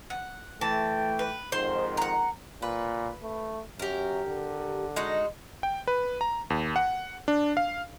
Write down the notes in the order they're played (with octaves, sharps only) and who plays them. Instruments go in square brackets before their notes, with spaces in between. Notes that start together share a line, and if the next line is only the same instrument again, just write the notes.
[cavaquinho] F#5
[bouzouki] E3 [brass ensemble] A3 G5 [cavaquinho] A5
[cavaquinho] B4
[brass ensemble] F2 G#2 D#3 [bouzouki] C5 [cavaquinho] C6
[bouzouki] F#5 A#5
[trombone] A#2 [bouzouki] B4
[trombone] A3
[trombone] F#2 [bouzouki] G4 A#4
[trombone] D3
[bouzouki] G#3 D#4 F#4
[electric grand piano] G5
B4
A#5
D#2
F#5
D4
F5